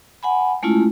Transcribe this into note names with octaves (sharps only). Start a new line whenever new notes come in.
F#5 G#5 B5
G#3 A3 C#4 E4 F4